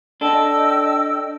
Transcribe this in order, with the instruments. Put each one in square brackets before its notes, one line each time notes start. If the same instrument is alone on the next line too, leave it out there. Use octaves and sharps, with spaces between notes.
[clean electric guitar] D4 A4 [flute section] D#5 G5 E6